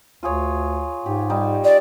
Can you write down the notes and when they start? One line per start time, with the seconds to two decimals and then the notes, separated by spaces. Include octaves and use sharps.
0.23 D2 F4 G#4 C#5
1.06 G#2 G4
1.30 G3 D#4
1.64 D5